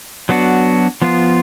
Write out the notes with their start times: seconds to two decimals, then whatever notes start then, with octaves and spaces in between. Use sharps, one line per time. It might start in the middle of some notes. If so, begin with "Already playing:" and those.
0.29 F#3 B3 D4 F#4
1.02 F3 B3 F4